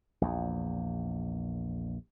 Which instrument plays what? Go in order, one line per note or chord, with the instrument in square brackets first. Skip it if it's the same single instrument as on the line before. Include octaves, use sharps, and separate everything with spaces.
[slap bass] A#1 E2